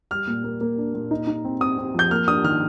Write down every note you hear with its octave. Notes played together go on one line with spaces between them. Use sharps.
G3 F6
A#2
A#3
A#3
D4
A#2
D#4
D#4
C4
C4 D#6
C4
F3 G6
A#3 F6
D4 D#6
D#3 F6